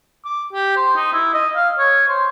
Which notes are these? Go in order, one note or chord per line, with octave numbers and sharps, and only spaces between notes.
D6
G4
C5
D#4
E4
D#5
F5
C#5
C5